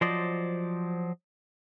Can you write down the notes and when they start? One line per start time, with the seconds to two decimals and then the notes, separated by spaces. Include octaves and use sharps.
0.01 F3 F#3 C5 D5 D#5